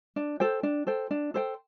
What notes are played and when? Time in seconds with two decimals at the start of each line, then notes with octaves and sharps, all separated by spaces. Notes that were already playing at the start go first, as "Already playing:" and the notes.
0.16 D4
0.40 A4 C5 G5
0.63 D4
0.87 A4 C5 G5
1.11 D4
1.34 A4 C5 G5